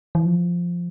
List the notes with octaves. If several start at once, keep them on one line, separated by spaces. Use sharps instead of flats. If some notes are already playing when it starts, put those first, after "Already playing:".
E3
F3